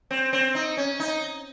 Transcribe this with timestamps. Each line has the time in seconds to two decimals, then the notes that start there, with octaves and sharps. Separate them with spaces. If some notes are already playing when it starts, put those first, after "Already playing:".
0.11 C4
0.33 C4
0.55 D#4
0.77 C#4
1.00 D#4